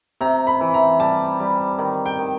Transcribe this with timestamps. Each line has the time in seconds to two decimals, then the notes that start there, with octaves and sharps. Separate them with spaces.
0.21 C3 A#5
0.47 B5
0.61 E3
0.74 A#5
0.99 G3 A5
1.40 G3
1.78 D#3
2.06 G5
2.19 D#3